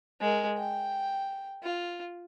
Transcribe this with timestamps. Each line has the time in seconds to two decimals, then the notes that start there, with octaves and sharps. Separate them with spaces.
0.21 G#3 A#4
0.58 G5
1.63 F4